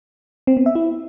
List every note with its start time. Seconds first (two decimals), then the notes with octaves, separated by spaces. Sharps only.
0.47 C4
0.57 B3
0.66 E5
0.75 E4